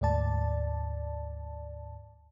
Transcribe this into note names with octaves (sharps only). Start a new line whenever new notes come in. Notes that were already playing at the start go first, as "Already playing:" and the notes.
D2 G#2 D5 A5